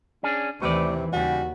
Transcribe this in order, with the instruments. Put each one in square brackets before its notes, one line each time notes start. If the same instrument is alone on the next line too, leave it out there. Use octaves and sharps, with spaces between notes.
[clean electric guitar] C#4 D4 G#4
[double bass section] D#2 E3 [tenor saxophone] C3 [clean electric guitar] A3 B4 D5
[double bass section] D#2 [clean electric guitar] C#3 G3 [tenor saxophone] F#4